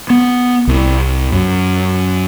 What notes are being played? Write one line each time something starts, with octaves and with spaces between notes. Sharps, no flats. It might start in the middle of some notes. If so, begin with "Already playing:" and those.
B3
C2
F#2